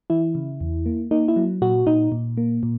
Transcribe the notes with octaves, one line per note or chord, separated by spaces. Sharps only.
E3 E4
C#3
E2
A#3
A#3 D#4
E4
F#3
A#2 F#4
A#2 D#4
A#2
A#3
A#2